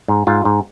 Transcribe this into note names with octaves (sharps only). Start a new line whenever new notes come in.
G#2
G#2 F4
G#2